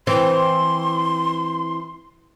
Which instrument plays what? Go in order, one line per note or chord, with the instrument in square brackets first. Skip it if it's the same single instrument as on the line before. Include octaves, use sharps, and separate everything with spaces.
[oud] E3 C4 [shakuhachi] C6